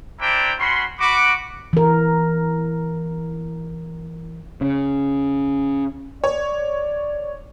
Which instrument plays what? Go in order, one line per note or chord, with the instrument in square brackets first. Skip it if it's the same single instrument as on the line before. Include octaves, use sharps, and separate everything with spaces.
[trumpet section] D4 E4 C5 D5 G5 A#5
C#4 F#4 B5 C6
F#4 B5 D6
[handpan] E3 A#4
[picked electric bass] C#3
[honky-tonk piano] C#5 [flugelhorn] D5